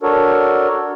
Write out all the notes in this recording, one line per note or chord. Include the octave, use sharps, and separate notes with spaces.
D4 F#4 A4 A#4 C#5